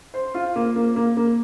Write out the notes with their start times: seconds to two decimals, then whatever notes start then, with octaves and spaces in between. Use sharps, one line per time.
0.14 C5
0.34 F4
0.56 A#3
0.76 A#3
0.96 A#3
1.17 A#3